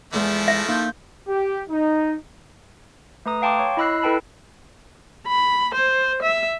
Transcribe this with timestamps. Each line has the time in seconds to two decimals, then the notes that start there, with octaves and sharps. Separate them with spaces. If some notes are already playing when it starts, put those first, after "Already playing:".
0.13 E2 F3 G#3 A3 E4
0.48 E5
0.69 A#3 D#4 G6
1.28 G4
1.69 D#4
3.26 A3 B4 A#5 D#6
3.42 F5 G5 A5 C6 D6
3.59 C#5 C#6
3.77 E4 D#5 B5 E6 F#6 C7
4.03 E4 A4 B4 G5 A5 B5
5.27 B5
5.75 C5
6.23 E5